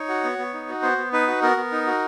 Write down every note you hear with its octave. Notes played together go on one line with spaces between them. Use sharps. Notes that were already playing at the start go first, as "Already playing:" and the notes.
Already playing: D#4 C#5
F#4
B3
B3
D#4
F#4
B3 C5
B3
D#4 B4
F#4
B3 A#4
B3
D#4
F#4